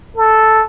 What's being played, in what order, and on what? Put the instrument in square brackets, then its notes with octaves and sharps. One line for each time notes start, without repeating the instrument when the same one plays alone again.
[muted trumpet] A4